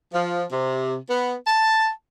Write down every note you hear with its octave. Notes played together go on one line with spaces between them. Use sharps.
F3
C3
B3
A5